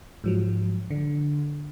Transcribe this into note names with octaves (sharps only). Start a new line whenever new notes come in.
G#2 F3 F#3
D3